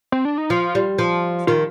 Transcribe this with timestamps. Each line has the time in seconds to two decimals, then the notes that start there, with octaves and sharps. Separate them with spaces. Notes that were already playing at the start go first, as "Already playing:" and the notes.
0.12 C4
0.25 D4
0.38 D#4
0.50 F3 F4
0.75 G3
0.99 F3
1.47 D#3 F4